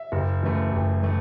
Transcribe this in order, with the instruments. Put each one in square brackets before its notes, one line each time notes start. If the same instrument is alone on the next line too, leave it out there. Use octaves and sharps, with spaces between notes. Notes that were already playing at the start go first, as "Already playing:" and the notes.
Already playing: [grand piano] E5
F#1
F#2 E3 A3
F#1
E3 A3